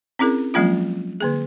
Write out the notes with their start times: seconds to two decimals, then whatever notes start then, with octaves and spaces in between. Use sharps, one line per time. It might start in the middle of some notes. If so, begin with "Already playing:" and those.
0.19 C4 C#4 E4 G#4 A#4
0.54 F3 F#3 G#3 A#3 C#4 F4
1.20 D3 A#3 G#4